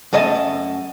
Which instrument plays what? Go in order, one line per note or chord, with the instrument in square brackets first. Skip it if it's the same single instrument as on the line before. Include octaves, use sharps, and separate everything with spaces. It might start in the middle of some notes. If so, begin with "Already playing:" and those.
[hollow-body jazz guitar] F#2 A3 D#5 G#5 A5